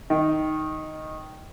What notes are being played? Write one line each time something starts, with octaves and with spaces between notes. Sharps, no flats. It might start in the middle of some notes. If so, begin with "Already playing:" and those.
D#3